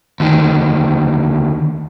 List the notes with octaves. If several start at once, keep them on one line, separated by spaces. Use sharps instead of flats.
D2 D#3